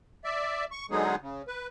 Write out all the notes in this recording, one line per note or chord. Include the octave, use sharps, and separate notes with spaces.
D5 E5
C#6
D3 F#3 G#3 B3 D#4 G#4
C#3
B4